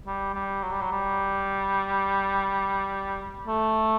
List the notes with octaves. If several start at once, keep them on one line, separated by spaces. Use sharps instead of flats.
G3
G3
F#3
G3
F#3
G3
A3